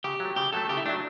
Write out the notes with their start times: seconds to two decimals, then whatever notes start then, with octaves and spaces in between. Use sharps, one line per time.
0.04 C#3 G4
0.20 F#3
0.25 A3
0.36 C#3 G4
0.53 F#3 A3 A4
0.69 C#3 G4
0.77 E4
0.86 F#3 A3 D4